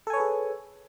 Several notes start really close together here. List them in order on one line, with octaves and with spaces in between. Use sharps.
A4 G#5 C#5 B4 G#4